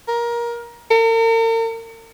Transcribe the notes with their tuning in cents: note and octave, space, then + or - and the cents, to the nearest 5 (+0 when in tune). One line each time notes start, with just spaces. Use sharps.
A#4 +20
A#4 -45